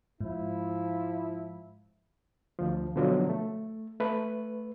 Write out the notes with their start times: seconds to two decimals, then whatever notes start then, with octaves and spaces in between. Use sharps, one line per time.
0.21 G#2 F3 E4
2.59 D2 F3
2.96 B2 D3 F3 F#3
3.30 A3
4.00 A3 B4